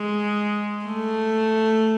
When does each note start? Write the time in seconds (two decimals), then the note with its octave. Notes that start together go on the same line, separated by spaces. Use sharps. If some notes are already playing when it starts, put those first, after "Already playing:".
Already playing: G#3
0.85 A3